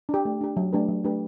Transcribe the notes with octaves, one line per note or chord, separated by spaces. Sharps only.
D4 G4
A3
D4 G4
F#3
A3 D4 G4 B4
F#3
A3 D4 G4 B4